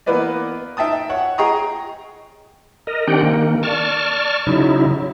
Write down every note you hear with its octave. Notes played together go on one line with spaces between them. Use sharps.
E3 A#3 B3 B4 D5 D#5
D#4 E5 G5 A5 D#6
C#5 F#5
G#4 D#5 G5 A#5 C#6 D#6
A#4 D#5
D#3 C4 D4 G4 F#5 G5
D#3 A#3
D5 A5 C#6 F6
C#3 F#3 D#4 E4